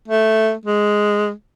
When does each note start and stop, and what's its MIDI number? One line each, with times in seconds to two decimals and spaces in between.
0.08 0.53 57
0.66 1.31 56